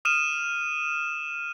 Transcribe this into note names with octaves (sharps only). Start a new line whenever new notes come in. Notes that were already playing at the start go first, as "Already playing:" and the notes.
D#6 F6 D#7 E7